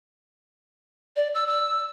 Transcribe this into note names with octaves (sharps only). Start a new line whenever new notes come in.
D5
E6
E6